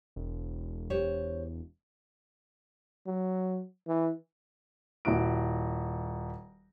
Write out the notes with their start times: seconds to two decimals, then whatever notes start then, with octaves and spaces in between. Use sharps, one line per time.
0.16 E1
0.90 G4 C5 C#5
3.06 F#3
3.88 E3
5.05 D#1 E4 F#4 D7